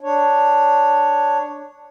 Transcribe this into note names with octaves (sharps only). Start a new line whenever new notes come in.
D4 C#5